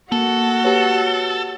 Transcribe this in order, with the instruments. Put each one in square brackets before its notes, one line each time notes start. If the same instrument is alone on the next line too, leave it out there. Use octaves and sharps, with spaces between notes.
[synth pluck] A#3 A5 [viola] F#4 F#5 [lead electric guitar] A4
[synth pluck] G4 B4 C#5